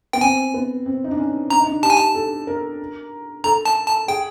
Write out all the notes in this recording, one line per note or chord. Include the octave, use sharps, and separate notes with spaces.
B3 G5
C4 G#5
B3
C4
D#4
D4
C#4
D4 A#5
D#4
D4
G4 A5
G#5
A5
A4
A#4
A4 A#5
A5
A5
G#4 G5